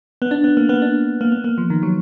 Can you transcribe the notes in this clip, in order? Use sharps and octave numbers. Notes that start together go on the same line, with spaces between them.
B3
D4
B3
A#3
B3
D4
A#3
B3
A#3
F3
D#3
F#3